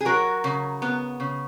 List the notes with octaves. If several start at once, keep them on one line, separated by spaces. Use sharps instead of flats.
G#4
F#3 F#4 A#4
C#3
B3
C#3